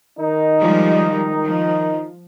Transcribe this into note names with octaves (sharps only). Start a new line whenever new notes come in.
D#3 D#4
F3 G3 G#3
F3